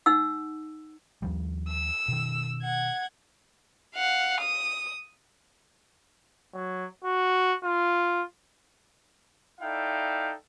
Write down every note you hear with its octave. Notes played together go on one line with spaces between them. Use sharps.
D#4 F#5 E6
D#2 F3 G3
E6
B2 D#3
F#5 G#6
F5 F#5
D#6
F#3
F#4
F4
D#4 E4 A4 D5 F5 G5